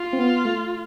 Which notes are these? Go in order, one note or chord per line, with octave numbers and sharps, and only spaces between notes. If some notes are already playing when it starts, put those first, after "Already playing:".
Already playing: F4
C4
B3
A3